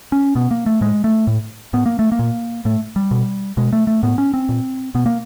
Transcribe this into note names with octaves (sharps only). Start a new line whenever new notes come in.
C#4
B2 B3
A#3
A3
A2 G#3
A3
A2
A2 B3
A#3
A3
A#3
A#2
A2 A3
G3
B2
B2 G#3
A3
A3
A2 B3
C#4
C4
A#2
B2 B3
A#3